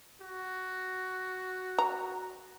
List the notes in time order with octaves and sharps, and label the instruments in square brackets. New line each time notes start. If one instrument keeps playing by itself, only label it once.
[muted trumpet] F#4
[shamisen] A#5